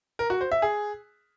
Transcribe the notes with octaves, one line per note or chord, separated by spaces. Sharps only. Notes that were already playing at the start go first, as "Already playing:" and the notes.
A#4
F#4
C5
E5
G#4